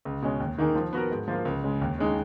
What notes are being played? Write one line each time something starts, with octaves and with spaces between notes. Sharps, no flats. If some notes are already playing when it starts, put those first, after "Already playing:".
C#2
B2 G#3 C#4
D#2
D#3 A#3 D#4 G#4
F3
B3 F#4 A#4
G#2
F3 A#3 F4
C#2
C#3 G#3
D#2
C#3 G#3 D#4 G#4